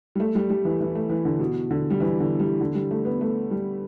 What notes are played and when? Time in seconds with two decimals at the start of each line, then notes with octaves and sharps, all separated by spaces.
0.15 G3
0.20 A3
0.35 G3
0.50 G3
0.65 E3
0.80 E3
0.95 A3
1.09 E3
1.25 D3
1.40 B2
1.71 D3
1.90 G3
2.00 E3
2.20 D3
2.40 G3
2.61 D3
2.75 G3
2.91 A3
3.05 B3
3.21 A3
3.51 G3